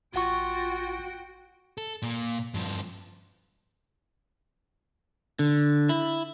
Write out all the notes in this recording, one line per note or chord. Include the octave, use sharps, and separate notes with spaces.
A1 F4 F#4 F#5 G5 C#6
A4
A#2
G2 F3
D3
E4